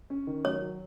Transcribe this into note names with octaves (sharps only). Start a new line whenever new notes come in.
C#4
D#3
F#3 C#5
F#3